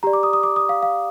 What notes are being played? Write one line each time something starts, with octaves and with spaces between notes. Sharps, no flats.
G4 D5 A#5
D6
D#6
D#6
D6
D#6
F5
F5